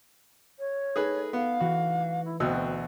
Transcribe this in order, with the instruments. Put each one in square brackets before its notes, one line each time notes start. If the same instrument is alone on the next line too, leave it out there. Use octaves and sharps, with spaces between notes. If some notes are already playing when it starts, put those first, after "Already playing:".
[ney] C#5
[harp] A3 D#4 A4 [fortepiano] G#4 B4
[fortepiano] B3 [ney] F5
[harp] E3 [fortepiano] F#4
[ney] E4
[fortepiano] D2 B2 E6 [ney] C4